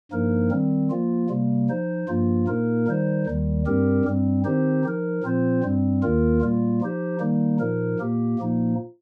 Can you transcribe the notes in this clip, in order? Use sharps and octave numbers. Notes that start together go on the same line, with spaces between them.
G2 F3 A#3 D#4 A#4
D#3 G3 C4
F3 A#3 F4
C3 G3 A#3
F3 D#4 C5
G2 F3 A#3 F4
A#2 A#3 D#4 A#4
D#3 G3 D#4 C5
D#2 D#3 G3
G2 G3 C4 G4 A#4
G2 G3 C4
D#3 C4 D#4 G4 C5
F3 D#4 A#4
A#2 F3 C4 F4 C5
G2 G3 C4
D#2 D#3 A#3 F4 A#4
A#2 G3 A#3 F4
F3 D#4 G4 C5
D#3 G3 A#3 D#4
A#2 F3 D#4 A#4
A#2 A#3 G4
A#2 F3 A#3 D#4